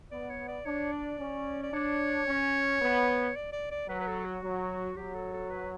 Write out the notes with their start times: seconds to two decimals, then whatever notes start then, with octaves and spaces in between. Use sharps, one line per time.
0.11 B3 D5
0.30 C#5
0.48 D5
0.66 D4 C#5
0.92 D5
1.19 C#4
1.63 D5
1.73 D4 C#5
2.27 C#4
2.81 B3
3.36 D5
3.52 D5
3.71 D5
3.89 F#3 B4
4.00 B4
4.07 A4
4.25 F#4
4.43 F#3
4.97 F#3 G4
5.15 A4
5.33 A4
5.50 B4